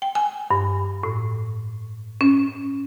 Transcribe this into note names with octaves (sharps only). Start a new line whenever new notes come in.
G5
G#5
G2
A2
C#4